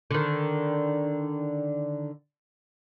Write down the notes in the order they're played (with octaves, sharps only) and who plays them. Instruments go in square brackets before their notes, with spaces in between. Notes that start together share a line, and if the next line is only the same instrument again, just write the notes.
[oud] D3 D#3